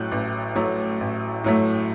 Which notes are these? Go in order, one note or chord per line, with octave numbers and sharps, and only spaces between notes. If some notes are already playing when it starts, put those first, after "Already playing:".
Already playing: A1 A2 F#3 A3 F#6 G6
A1
A2 F#3 A3
A1
A2 F#3 A3